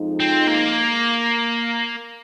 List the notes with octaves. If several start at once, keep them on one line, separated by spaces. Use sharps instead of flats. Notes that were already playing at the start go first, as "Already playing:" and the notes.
Already playing: F2 F3 G#3 D#4
C4
A#3